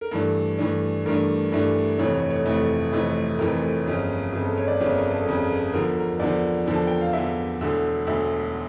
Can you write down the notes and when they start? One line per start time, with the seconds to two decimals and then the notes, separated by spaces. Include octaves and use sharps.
0.01 A#4
0.11 G2 E3 A3 D4 A4
0.59 G2 E3 A3 D4
1.06 G2 E3 A3 D4 A#4
1.52 G2 E3 A3 D4
1.98 F1 F2 E3 A3 C#5
2.14 C#5
2.30 C#5
2.46 F1 F2 E3 A3
2.92 F1 F2 E3 A3
3.39 F1 F2 E3 A3 A#4
3.86 G1 F2 C#3
4.32 G1 F2 C#3
4.44 A4
4.58 C#5
4.68 D5
4.80 G1 F2 C#3 C#5
4.95 A#4
5.11 A4
5.26 G1 F2 C#3
5.73 E2 D3 F3 A#4
5.97 A#4
6.20 E2 D3 F3 D5
6.67 E2 D3 F3
6.75 A5
6.87 G5
7.01 F5
7.13 E2 D3 F3 E5
7.61 E1 D2 D3
8.07 E1 D2 D3 E5